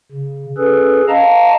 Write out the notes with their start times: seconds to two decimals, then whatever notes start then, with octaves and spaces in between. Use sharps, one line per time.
0.12 C#3
0.57 C#4 G#4 A4 B4
1.08 D#5 F5 A5 A#5